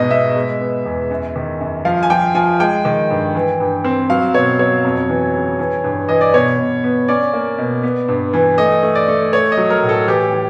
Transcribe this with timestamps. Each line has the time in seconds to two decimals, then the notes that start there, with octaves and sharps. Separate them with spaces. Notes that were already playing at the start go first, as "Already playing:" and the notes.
Already playing: G#2 B2 B3 D#5
0.11 B2 E5
0.36 G#3
0.61 B3
0.86 E2
1.11 F#2
1.36 D#3
1.61 F#2
1.85 F3 F5
2.03 G#5
2.10 F3 G5
2.35 F3 G#5
2.60 G#3 G5
2.85 D#3
3.10 G2
3.35 E3
3.60 G2
3.84 C4
4.10 F#3 F5
4.34 B2 C#5
4.59 F#3 C#5
4.84 F2
5.09 E3
5.34 C#3
5.59 E3
5.84 G2
6.09 E3 D#5
6.21 D5
6.34 B2 C#5
6.59 B2
6.84 B3
7.08 C#4 D5
7.33 A#3
7.58 B2
7.83 B3
8.08 G2
8.33 E3
8.58 A3 D#5
8.83 A3
8.95 D5
9.08 A3
9.33 A3 C#5
9.52 D#5
9.57 F#3
9.70 A#4
9.83 A2
9.89 A4
10.08 E3 G4
10.33 E3